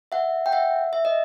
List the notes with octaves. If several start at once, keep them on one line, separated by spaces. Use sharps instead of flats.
E5 F#5
G5
E5 F#5
E5
D#5